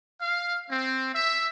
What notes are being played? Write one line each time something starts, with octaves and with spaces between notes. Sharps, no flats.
F5
C4
E5